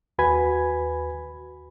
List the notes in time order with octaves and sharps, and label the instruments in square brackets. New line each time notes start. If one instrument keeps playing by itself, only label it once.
[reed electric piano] D#2 F#4 B4 G#5 B5 G#6